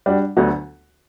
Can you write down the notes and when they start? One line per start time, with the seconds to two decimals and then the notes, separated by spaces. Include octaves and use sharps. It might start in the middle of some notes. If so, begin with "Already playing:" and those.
0.06 G3 D4 F#4
0.37 D2 D3 F#3 B3 F#4